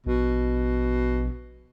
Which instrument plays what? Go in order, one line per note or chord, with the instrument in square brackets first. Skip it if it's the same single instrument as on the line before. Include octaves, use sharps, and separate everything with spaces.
[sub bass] A#1 [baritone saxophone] B2